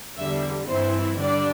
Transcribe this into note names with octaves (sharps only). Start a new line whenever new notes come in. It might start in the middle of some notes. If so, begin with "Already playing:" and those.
E2 D3 G3 E5
G2 E3 C4 E4 C5
D3 G3 D4 D5